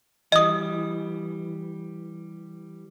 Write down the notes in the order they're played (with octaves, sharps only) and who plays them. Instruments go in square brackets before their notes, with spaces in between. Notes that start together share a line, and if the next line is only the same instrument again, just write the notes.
[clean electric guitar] E3 G3 [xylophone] D#5 D#6